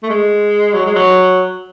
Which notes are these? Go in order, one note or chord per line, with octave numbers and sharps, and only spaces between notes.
A3
G#3
F#3
G#3
F#3